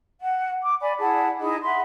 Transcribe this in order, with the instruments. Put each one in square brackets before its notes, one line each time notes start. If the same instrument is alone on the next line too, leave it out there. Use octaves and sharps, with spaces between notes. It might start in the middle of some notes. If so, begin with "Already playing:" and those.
[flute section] F#5
D6
D5 G#5 B5
E4 G#4 F#5 A5
D#4 E4 G#4 D#5
E5 F#5 B5 C6